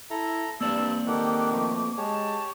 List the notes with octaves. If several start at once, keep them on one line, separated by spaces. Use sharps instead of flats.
E4 A4 A#5
G2 A#3 C4 D5 A5 E6
D#3 G4 A4 F#5 D6
F2 B2 A3
G#3 G4 C#5 A5